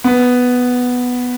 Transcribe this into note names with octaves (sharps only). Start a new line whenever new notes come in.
B3